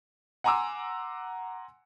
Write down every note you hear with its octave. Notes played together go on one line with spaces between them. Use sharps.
F#5 G#5 A#5 C6 D6 E6